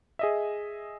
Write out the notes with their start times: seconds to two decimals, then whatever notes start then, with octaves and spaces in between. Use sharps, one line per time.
0.19 G#4 D#5 E5